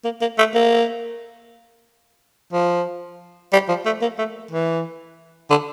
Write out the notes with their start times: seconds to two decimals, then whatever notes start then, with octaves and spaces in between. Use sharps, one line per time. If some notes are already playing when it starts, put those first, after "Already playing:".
0.04 A#3
0.21 A#3
0.38 A3
0.55 A#3
2.53 F3
3.53 G3
3.69 F3
3.86 A3
4.02 A#3
4.18 A3
4.51 E3
5.50 D3